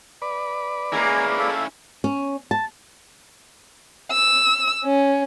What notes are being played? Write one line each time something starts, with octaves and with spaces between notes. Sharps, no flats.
B4 D5
G#3 A#3 C#4 E4 G#5 A#5
A4 E5 F5
C#4
A5
E6
C#4